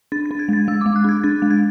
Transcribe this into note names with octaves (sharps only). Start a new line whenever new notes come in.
D4 A6
A6
D4
G#6
G#3 A6
G#3 E6
G#3 D6
F#6
D4 G#6
D4 A6
G#3
G#6